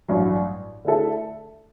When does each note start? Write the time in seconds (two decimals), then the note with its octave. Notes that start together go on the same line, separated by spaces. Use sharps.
0.08 A1 G2 F#3
0.85 D3 A3 E4 A4 E5